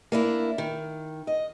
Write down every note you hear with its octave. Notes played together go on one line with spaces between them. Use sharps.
A#3 D4 E4
D#3
D#5